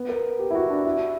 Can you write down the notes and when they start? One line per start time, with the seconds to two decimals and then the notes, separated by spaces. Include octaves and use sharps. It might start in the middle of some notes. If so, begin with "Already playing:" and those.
Already playing: B3
0.09 A#4
0.39 G4
0.50 E4
0.55 F#4
0.70 D4
0.85 E4